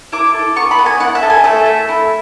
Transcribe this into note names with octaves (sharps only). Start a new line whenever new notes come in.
E4 D6
A4
B3 C#6
B5
B3
G#5
E4 F#5
E5
A4
G#5
A3 E5
A3
E4